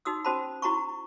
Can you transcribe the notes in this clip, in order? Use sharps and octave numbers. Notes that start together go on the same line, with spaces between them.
D#4 F#4 D#6 E6
C#4 F#4 C5 A5 B5
E4 F#4 A#5 B5 C#6